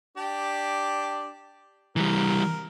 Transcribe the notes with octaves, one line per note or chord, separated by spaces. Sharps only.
D4 G4 D5
E3 G3 A#4